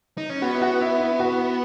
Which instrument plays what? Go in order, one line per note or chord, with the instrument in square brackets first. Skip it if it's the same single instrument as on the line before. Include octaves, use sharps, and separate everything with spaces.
[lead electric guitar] D#4
C#4
[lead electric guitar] B3 [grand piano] F#4
[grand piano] E4
F#4
E4
E4
F#4